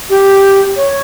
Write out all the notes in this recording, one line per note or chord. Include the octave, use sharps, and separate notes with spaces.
G4
C#5